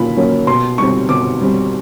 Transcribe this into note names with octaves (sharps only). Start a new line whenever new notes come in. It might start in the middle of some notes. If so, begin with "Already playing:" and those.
Already playing: A#2 F#3 A#3 C#4 B5
F#3 A#3 C#4
B2 C6
G3 C4 C#6
B2 D6
G3 C4